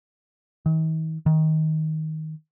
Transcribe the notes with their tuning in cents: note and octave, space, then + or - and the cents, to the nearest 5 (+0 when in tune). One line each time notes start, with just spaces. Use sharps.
D#3 +45
D#3 +15